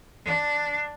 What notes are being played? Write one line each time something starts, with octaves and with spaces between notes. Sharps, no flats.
D4